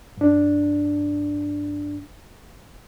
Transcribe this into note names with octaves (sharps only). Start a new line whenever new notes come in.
G2 D4